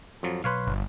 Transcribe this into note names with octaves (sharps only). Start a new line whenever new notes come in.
F2 F3 F#3
B1 B4 C#5 F5 C6
G1